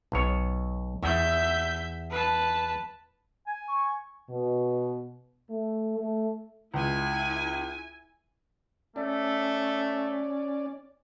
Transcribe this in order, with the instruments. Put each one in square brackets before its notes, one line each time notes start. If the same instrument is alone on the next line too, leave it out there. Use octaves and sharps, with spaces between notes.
[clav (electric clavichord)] B1 C#5
[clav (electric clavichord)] E2 [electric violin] E5 G6
[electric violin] B4 A5
[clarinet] G#5
[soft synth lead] C#6
[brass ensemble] B2
A3
A3
[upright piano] C#2 [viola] E4 G#5
[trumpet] A3 [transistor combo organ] C#4 D5